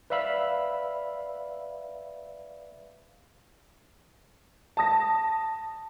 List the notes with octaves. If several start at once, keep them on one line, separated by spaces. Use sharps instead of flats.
B4 D5 E5 F5 B5 E6
A5 D#6 A#6